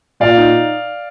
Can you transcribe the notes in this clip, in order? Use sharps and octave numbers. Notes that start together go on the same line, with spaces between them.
A#2 D5 F5
D#4